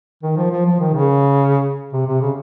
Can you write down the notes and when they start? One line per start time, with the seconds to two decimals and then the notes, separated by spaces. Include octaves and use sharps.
0.23 D#3
0.37 F3
0.51 F3
0.65 F3
0.80 D#3
0.94 C#3
1.93 C3
2.07 C3
2.21 C#3